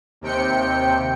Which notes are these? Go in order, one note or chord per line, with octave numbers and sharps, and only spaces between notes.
D#2 C3 G5 C#7